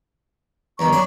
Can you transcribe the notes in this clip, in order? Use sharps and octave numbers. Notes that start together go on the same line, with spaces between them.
E2 G2 D#3 A#5 C#6
F#2 D4 G#5